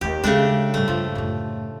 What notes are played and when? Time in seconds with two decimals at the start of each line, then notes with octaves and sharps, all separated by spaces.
0.01 D#2 A#3 G4
0.24 C#3 G#3 A3 D4
0.74 G#2 G3 A3
0.88 G2 F3 F4
1.15 F#2 A2